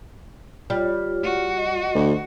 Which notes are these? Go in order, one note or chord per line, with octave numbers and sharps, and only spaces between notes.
G3 F4 C#5
F#4
D#5
D2